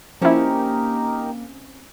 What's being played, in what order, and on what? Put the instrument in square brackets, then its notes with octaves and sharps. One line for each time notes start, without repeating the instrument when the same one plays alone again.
[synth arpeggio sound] F3 E4 [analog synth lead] A#3 [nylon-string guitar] C4 C#4 [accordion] D#4 G4 A#4